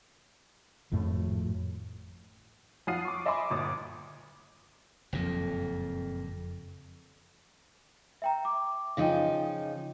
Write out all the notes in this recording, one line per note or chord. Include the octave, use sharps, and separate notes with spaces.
G#1 F2 A2 A3
F2 F4 F#5 D#6 C7 D#7
C#6 D6
D#5 E5 G#5 B5 C6 D6
G1 A#2 D6 D#6
F#1 F2 A#2 F3
E5 G5 A#5
D6
C#3 F3 D#4 F5 G5